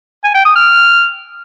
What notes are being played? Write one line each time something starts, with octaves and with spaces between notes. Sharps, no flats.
G#5
G5
D#6
F6